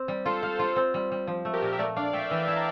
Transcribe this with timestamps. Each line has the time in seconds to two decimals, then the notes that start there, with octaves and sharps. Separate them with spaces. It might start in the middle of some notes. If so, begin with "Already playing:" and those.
Already playing: C4
0.08 G3
0.25 F4 A4 C5
0.43 F5
0.59 F4
0.76 C4
0.94 G3
1.12 G3
1.27 F3
1.45 A3
1.53 G4 A#4
1.62 A#2
1.73 E5
1.79 A3 A#4 D5
1.96 D4 D5 F5
2.13 A3 E5 G5
2.30 E3 E5 G5
2.47 E4 A5
2.56 G5 A#5